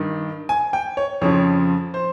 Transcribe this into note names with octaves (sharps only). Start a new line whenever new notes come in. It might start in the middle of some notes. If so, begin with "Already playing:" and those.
Already playing: G2 D#3
G#5
G5
C#5
F2 C#3 F3 C#5
C5